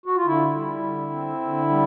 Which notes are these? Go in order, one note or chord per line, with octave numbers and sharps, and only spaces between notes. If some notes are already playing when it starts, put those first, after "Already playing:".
F#4
F4
D3 E4
G3
D3
C4
D3
G3